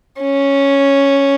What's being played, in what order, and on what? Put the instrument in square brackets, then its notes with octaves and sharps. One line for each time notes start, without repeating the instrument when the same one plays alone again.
[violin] C#4